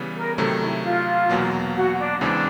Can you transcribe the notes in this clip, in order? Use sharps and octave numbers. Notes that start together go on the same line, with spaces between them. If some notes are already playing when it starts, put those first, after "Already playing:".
Already playing: C#3 E3 G3 B3
A#4
C3 D#3 F#3 A3 A4
E4
F4
E2 B2 F#3 A#3
F#4
D4
E2 C#3 E3 G#3 C4 D4